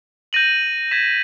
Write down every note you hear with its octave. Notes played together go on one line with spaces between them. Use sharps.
G6 A#6 D#7 F#7
G#6 B6 E7